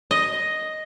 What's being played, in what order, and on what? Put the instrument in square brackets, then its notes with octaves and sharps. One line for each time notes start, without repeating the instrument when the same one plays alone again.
[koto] D#5